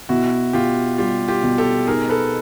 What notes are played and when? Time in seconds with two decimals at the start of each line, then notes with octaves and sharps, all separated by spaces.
0.09 B2 E4 F#4
0.53 B2 F4 G4
0.98 G3 F4 G4
1.28 F4 G4
1.43 B2
1.58 G4 A4
1.87 D#4 G#4 A#4
2.09 A4 B4